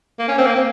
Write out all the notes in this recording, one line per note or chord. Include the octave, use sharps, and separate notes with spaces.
A#3
C#4
C4
A#3
C4